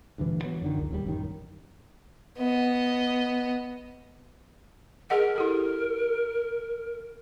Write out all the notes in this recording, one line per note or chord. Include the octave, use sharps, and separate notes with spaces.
D2 G2 A#2 E3
E3 F#3 B3
F#2 D3 D#3
C#2
D#1 D#2 D3 G3
A1 F#2 D#3
B3 D#5
G#4 A#4 D#5 F#5
E4 G4 A4